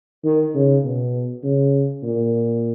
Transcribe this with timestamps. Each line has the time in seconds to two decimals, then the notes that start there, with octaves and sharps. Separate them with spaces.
0.25 D#3
0.55 C#3
0.84 B2
1.44 C#3
2.03 A#2